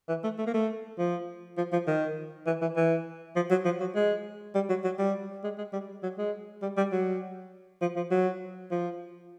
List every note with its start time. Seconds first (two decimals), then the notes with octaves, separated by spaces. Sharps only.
0.09 E3
0.24 A3
0.38 A3
0.47 A#3
0.54 A3
0.99 F3
1.58 F3
1.73 F3
1.87 D#3
2.47 E3
2.62 E3
2.76 E3
3.36 F3
3.50 F#3
3.65 F3
3.80 F#3
3.96 G#3
4.55 G3
4.69 F#3
4.84 F#3
4.99 G3
5.44 G#3
5.58 G#3
5.73 G3
6.03 F#3
6.18 G#3
6.62 G3
6.77 G3
6.92 F#3
7.82 F3
7.97 F3
8.11 F#3
8.71 F3